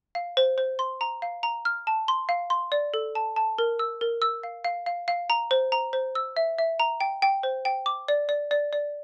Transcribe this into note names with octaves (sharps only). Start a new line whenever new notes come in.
F5
C5
C5
C6
A#5
F5
A#5
F6
A5
C6
F5
C6
D5
A4
A5
A5
A#4
E6
A#4
E6
F5
F5
F5
F5
A#5
C5
A#5
C5
E6
E5
E5
A#5
G5
G5
C5
G5
D6
D5
D5
D5
D5